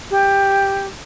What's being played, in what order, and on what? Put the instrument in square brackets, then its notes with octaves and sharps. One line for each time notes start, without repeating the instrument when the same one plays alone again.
[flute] G4